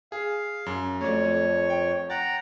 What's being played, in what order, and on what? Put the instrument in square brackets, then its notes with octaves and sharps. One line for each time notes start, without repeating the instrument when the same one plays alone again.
[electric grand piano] G#4 [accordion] F5
[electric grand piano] F#2
[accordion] F2 C#5 [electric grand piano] A3 D5
[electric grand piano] G5
[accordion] F#5 G5 A#5 [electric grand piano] A6